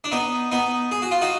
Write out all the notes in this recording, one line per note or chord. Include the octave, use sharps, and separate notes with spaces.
D4
B3 D#4
B3 D#4
G#4
F#4
F4
D#4 F#4